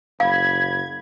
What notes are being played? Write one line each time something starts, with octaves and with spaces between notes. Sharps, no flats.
F#1 F5 B5 G#6